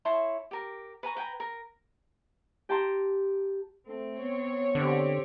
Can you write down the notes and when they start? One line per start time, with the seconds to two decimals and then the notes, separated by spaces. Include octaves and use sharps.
0.05 E4 C#5 A5 C6
0.51 G4 A#4
1.03 B4 G#5 A#5 C#6
1.16 B4 G5 G#5 A#5
1.40 A#4
2.69 G4 G5 A5 A#5 C6
3.87 A3 C4
4.19 B3 C#5
4.75 D3 C4 G4